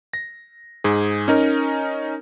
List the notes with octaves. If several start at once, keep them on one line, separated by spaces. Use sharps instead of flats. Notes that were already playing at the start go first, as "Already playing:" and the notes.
A#6
G#2 G#4
C#4 D#4 A#4